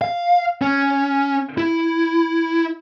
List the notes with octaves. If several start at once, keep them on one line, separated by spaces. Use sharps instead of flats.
F5
C#4
E4